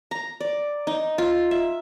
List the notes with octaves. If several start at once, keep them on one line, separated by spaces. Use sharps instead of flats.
A#5
D5
D#4
F4
E5